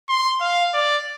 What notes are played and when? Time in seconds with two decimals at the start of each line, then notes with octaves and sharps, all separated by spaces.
0.09 C6
0.41 F5
0.74 D5